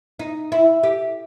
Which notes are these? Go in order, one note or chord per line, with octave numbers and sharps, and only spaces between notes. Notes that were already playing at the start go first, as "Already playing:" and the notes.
D#4
E4
G4